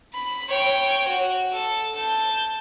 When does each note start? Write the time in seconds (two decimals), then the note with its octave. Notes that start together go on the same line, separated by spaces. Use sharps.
0.14 B5
0.49 C#5 G5
1.09 F#4
1.54 A4
1.94 A5 G6